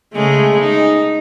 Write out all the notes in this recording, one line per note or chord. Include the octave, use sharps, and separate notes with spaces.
C#3 G#3 A3
D#4